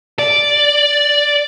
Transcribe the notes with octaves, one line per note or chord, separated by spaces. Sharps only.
D5